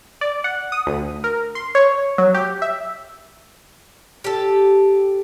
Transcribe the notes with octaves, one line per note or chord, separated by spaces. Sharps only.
D5
F#5
D#6
D2
A#4
C6
C#5
F#3
G4
E5
G4 A4